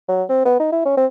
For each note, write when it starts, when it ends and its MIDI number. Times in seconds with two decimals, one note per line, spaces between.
0.08 0.23 54
0.29 0.42 60
0.45 0.58 59
0.59 0.67 63
0.72 0.82 64
0.85 0.95 61
0.97 1.06 60